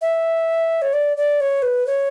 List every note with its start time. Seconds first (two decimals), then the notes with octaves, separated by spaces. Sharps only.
0.01 E5
0.82 C#5
0.93 D5
1.17 D5
1.40 C#5
1.62 B4
1.87 C#5